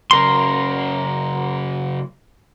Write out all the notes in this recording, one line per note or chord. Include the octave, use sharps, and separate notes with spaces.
F#2 C#3 A#4 C6